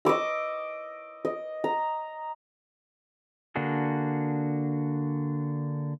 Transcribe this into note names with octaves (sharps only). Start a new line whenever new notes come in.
D#5 C#6 D6 E6
D#5
A#5
D3 A#3 D4 F#4 G#4